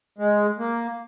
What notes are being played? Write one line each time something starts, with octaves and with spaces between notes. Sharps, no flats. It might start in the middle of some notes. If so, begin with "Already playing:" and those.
G#3
A#3